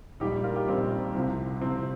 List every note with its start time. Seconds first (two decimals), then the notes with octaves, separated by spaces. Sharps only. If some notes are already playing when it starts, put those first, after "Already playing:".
0.20 A#1 A#2 G3 D#4 G4
0.43 F4 A#4
0.56 D#4 G4
0.67 A#1 A#2 G3 C4 F4
1.15 C2 C3 F3
1.61 C2 C3 F3 C4